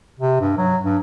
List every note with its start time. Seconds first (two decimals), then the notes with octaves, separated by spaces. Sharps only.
0.19 C3
0.41 G2
0.58 F#3
0.84 G2